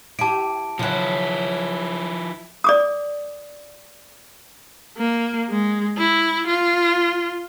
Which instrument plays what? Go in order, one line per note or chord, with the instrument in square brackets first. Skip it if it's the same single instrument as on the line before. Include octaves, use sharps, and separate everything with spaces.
[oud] E4 G4 [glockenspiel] A5 D7
[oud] C#3 F#3 [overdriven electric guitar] F3 E4
[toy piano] D5 D6 D#6
[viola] A#3
G#3
E4
F4